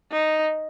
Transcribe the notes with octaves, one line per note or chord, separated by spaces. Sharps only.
D#4